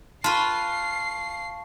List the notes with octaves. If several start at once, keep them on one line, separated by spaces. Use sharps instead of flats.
F4 B4 A5 C#6 C7